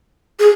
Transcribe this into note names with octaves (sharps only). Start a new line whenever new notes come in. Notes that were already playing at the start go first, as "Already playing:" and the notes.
G#4